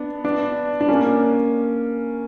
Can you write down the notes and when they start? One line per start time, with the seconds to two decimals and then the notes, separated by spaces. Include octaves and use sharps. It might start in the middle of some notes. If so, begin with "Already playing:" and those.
Already playing: B3 D4
0.25 B3 D4
0.81 D4
0.88 A#3 C#4